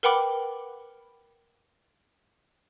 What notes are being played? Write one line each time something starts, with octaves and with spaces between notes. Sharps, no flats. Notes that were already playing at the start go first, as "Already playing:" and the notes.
A#4 B4 F#5 G5 B5 D6